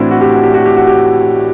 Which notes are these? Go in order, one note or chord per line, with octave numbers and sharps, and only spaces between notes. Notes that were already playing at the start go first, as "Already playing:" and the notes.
Already playing: A2 E3 C4 D4 E4 F#4
F#4
G4
F#4
G4
F#4
G4
F#4
G4